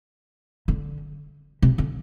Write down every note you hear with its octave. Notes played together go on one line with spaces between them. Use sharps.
D3
C3
D3